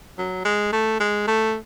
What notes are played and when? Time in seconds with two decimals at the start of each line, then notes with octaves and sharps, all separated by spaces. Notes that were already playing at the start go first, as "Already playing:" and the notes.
0.18 F#3
0.45 G#3
0.73 A3
1.00 G#3
1.27 A3